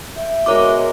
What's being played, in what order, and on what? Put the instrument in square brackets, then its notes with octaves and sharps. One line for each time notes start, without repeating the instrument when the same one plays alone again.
[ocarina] E5 [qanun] G5
[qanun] B2 G#3 F#4 [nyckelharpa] A#4 [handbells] C#5 D6